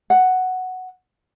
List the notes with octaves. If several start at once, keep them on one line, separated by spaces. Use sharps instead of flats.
F#5